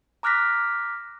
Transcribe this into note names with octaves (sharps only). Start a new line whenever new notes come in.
A#5 D6 F6 F#6 A#6 B6